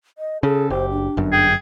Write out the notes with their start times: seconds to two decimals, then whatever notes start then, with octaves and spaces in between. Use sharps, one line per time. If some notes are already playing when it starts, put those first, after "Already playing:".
0.18 D#5
0.43 C#3 G#4 A4
0.70 F#1 G4 C5
0.91 D4
1.17 G1 F#2
1.32 G#4 G5